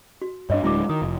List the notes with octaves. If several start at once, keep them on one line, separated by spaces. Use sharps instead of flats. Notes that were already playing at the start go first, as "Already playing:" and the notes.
F#4
G2 D4 C#5 D#5
D1 G#3 D4 E4 F#4 D6
D#3 D#6
F1